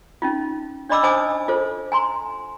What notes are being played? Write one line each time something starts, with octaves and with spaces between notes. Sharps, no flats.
C#4 D#4 F4
D4 D5 D#5 B5 D6 E6
D4 C5 G#5 A5 D6 D#6
F4 A4 C5
G#5 A#5 C6